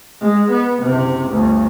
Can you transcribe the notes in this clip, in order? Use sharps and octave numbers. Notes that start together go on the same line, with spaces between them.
G#3
B3
F#1 C3
G1 D2